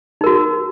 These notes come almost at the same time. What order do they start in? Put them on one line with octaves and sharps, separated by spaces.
D#4 A#4 F#4